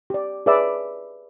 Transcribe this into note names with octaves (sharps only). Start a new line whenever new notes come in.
G4 D5
G#4 B4 C#5 D5 E5 E6